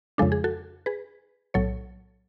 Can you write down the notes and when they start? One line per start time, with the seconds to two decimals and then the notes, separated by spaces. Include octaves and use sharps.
0.18 F2 C#3 F3 G#3 D4 A4
0.32 G#4
0.44 F#4 A4
0.86 G#4 B4
1.54 B1 A2 F#3 A4 C#5